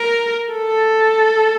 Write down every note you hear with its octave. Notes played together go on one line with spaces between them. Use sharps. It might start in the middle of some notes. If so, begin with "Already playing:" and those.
Already playing: A#4
A4